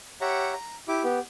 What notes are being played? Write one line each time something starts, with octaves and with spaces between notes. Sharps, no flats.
G4 C#5 E5 F#5 A#5
A#5
E4 G4 D6
B3 G4